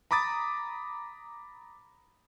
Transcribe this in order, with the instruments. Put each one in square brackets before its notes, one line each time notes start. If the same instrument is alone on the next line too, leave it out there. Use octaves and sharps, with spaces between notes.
[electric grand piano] A#5 B5 D6 D#6 A6